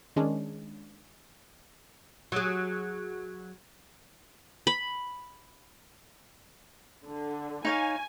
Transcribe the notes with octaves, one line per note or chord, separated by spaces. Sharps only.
D#3 G#3 C#4 D4
F#3 G#4
B5
D3
D#4 C#5 F5 G#5